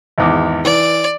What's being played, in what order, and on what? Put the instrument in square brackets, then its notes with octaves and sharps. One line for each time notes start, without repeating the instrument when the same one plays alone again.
[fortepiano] G#1 E2 D6
[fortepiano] E3 [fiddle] D5